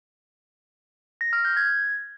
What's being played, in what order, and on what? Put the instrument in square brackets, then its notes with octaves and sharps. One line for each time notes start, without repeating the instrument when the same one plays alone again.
[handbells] A#6
F6
G6
G#6